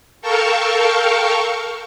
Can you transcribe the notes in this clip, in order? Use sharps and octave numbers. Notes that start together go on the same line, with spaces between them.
A4 A#4 F5 G5 A5 C#6